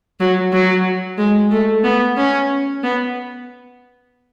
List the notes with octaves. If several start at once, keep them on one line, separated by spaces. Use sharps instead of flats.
F#3
F#3
G#3
A3
B3
C#4
B3